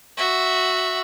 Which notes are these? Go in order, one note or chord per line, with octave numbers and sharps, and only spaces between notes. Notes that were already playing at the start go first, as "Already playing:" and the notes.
F#4 E5